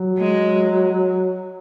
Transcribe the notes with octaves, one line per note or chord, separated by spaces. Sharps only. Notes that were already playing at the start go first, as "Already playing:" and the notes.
Already playing: F#3
G#3